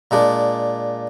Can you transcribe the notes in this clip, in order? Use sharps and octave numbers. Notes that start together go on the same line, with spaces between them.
A#2 G#3 D4